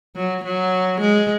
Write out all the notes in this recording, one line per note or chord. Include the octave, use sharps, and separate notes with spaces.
F#3
F#3
G#3